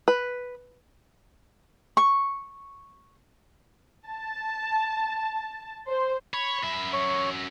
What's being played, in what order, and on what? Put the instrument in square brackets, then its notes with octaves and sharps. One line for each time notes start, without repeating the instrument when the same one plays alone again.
[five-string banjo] B4
[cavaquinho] C#6
[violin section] A5
C5
[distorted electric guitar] C#5 [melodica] B5
[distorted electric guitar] F#2 E5
[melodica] C#5